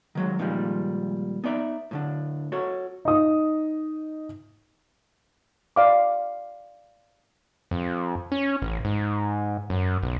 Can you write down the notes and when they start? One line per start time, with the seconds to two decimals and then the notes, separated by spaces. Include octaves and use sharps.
0.15 D#3 F#3 G#3
0.39 A#2 D3 D#3 F3 G3 G#3
1.44 B3 D#4 D5 E5
1.91 A2 D3 D4
2.52 F#4 A4 C#5
3.05 D#4 D#6
5.76 D5 F5 D6
7.71 F2
8.32 C#4
8.62 A1
8.85 G#2
9.70 F#2
10.03 B1